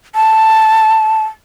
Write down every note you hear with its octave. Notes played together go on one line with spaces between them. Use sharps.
A5